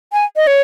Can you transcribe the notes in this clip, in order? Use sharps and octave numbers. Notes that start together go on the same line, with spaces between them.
G#5
D#5
C#5